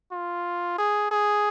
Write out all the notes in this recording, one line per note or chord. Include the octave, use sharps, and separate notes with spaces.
F4
G#4
G#4